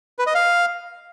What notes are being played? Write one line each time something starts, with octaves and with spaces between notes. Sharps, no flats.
B4
D#5
F5